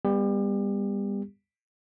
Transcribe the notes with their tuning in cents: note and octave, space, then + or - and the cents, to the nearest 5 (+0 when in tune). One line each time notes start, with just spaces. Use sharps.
G3 +30 B3 -5 G4 +30